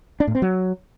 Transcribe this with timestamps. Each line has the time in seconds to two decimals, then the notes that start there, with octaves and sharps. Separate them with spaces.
0.20 D4
0.27 A2
0.35 C4
0.42 F#3